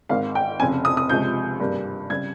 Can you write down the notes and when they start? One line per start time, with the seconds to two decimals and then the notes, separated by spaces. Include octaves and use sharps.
0.09 G#1 G#2 D#3 G#3 F5
0.35 G5
0.60 F1 F2 C#3 G#5
0.85 D#6
0.97 D#6
1.09 C#2 C3 F3 G#3 G6
1.60 G#1 G2 G3 A#3
2.10 C#3 G3 G#6